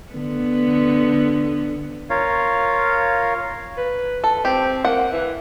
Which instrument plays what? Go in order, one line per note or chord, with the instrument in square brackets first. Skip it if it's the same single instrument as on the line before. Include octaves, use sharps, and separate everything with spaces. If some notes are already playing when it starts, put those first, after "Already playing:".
[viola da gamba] D3 B3
[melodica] F4 A#4 C#5 F5
[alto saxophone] B4
[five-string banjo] A4
[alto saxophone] C4 [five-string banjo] G4
[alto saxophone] A#3 [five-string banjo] F#5
[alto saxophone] E3